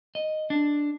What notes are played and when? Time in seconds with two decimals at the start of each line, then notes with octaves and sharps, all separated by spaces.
0.15 D#5
0.50 D4